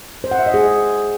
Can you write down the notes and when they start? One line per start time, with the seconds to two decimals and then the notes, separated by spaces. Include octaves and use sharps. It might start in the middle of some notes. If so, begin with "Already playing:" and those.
0.24 C5
0.31 F#5
0.39 E5
0.46 D#5
0.54 G#4